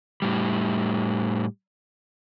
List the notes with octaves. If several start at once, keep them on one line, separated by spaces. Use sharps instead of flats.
A2 G3